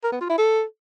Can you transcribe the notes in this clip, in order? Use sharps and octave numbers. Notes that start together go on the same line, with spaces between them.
A#4
B3
F4
E4
A4